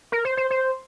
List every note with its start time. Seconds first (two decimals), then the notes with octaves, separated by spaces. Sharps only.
0.12 A#4
0.25 C5
0.37 C5
0.51 C5